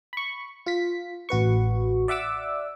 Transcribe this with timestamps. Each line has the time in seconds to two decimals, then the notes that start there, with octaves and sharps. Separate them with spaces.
0.13 B5 C#6
0.66 F4 B6
1.29 A1 F#4 B4 C#6
2.08 D5 E5 F#5 D6 E6